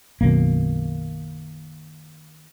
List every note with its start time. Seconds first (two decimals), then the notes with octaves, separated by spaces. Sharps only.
0.21 B1 F#2 B2 D#3 A#3